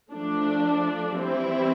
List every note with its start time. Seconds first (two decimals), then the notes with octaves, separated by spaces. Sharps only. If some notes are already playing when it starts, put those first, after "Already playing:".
0.11 F3 A3 D4
1.16 E3 G3 C4 E4